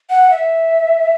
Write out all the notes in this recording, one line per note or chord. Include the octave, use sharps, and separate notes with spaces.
F#5
E5